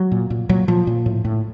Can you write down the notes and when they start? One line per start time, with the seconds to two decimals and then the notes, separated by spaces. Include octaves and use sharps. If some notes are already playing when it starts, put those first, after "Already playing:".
Already playing: F#3
0.11 A#2
0.30 A#2
0.49 A#2 F#3
0.68 A#2 F3
0.87 A#2
1.06 A2
1.24 A2